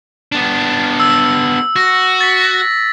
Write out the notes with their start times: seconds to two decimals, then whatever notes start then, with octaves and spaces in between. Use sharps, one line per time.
0.32 B3 D4
1.00 E6
1.76 F#4 A#6
2.21 A6 B6